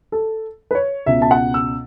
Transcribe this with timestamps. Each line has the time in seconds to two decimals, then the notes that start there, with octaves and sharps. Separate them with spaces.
0.12 A4
0.71 B4
0.75 C#5
1.06 C#2 B2 E5
1.22 A5
1.31 F#5
1.54 E6